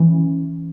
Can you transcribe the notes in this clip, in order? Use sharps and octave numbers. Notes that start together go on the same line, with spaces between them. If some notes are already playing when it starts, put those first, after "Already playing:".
Already playing: E3 C#4